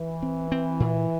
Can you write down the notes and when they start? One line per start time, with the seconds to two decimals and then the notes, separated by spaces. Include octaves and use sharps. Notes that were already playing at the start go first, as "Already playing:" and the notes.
Already playing: E3
0.23 C4
0.52 C4
0.80 A#2